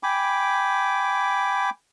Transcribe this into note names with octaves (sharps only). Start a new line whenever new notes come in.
G5 G#5 B5 D6